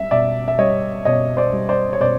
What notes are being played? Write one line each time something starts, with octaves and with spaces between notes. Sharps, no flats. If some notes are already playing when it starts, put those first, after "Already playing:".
Already playing: G3 E5
B2 D5 E5
E5
G3 C#5 D#5
B2 C#5 D#5
C5 D5
G3
C5 D5
C#5
B2 C5 D5